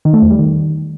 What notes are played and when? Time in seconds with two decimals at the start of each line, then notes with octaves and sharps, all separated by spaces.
0.05 D#3
0.14 A3
0.22 E2
0.30 G3
0.39 D#3